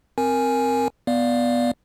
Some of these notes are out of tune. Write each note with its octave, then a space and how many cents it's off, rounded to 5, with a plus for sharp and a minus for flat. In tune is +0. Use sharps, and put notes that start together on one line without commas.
C4 +0 A#4 +0 G#5 +0
B3 +0 D5 +0 F5 +0